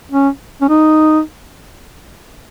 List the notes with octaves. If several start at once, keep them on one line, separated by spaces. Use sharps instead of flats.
C#4
C#4
D#4